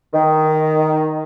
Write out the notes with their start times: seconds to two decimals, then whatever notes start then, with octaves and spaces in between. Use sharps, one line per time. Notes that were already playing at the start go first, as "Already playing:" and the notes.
0.14 D#3